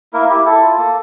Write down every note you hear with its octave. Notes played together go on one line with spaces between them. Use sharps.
A#3 E4 A#4
E4 G4
E4 A4
F4
A#3